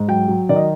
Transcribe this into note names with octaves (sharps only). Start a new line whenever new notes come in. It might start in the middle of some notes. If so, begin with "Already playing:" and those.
Already playing: G#2
F#3 G5
F#3
D#3 D5
D#5